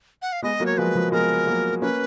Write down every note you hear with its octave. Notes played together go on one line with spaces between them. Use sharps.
F#5
F5
G#3 B3 D#5
F#3 A#3
C#5
F3 G#3 B4
F3 G#3
G#3 B3 A#4
F#3 A#3
A#3 C#4 B4